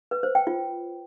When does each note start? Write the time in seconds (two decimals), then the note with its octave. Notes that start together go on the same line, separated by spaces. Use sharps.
0.11 B4
0.23 C5
0.35 G5
0.47 F4